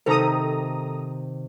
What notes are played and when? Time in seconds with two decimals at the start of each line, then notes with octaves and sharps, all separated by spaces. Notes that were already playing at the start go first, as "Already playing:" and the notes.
0.06 C3 D#3 D#4 A4 A#5 D#6